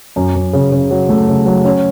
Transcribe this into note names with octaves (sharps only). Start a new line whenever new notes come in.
F#2
F#2
C#3
C#3
F#3
A3
C#3
F#3
C#4